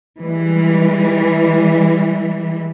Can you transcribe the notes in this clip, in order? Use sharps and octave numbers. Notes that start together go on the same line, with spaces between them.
E3 G3 G#3